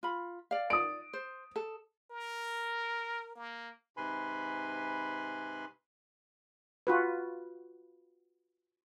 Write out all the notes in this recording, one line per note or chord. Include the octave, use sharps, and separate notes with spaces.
F4 B5
D5 F5
D5 D#6 D7
C5
A4
A#4
A#3
G#2 C3 B4 G#5 B5 C6
F4 F#4 B4